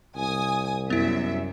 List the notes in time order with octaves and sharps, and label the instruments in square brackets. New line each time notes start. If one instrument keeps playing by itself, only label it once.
[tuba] C2 [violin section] G#5 D#6
[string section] F#2 [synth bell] B3 E4 [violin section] E5